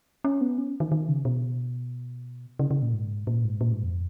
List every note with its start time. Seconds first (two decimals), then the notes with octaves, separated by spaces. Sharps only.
0.24 C#4
0.41 B3
0.58 C#4
0.80 D#3
0.92 D#3
1.08 C#3
1.25 B2
2.59 C#3
2.71 C#3
2.82 A#2
2.94 G#2
3.27 A#2
3.44 G#2
3.61 A#2
3.72 G#2
3.83 F2